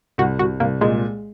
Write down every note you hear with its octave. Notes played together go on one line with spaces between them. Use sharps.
C2 F#4
C2 F#4
C2 A#3
A#2 G#3